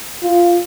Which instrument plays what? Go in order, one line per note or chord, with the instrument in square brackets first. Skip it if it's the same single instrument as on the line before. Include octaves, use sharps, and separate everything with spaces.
[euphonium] F4